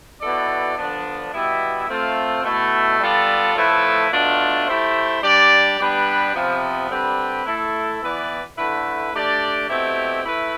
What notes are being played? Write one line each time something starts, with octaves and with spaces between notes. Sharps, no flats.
B2 B3 E4 A4 D5
D3 F3 B3 D4
B2 G3 B3 E4
A3 C4 F4
B2 A3 E4
G3 B3 F4 A4 D5
A2 F3 A3 E4 B4
B2 A3 D4 F4
A3 E4 G4 C5
G3 D4 G4 D5
G3 B3 D4 G4 B4
C3 F3 B3
D3 G3 C4 G4 B4
A3 E4 A4
E3 B3 E4 B4 D5
D3 A3 E4 B4
A3 D4 G4 D5
B2 A3 C4 E4 G4
A3 E4 B4